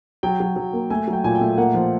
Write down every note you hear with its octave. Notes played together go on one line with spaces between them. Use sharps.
F#3 G5
F#3
F#3
A#3
A3 G#5
F#3
G5
A#2 G#5
G5
A3
A#3 F#5
F3